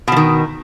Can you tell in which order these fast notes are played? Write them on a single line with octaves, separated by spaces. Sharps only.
B2 F3 D#3